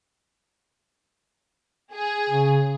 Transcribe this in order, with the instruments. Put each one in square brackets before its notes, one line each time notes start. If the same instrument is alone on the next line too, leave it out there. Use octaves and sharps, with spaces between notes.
[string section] G#4
[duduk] C#3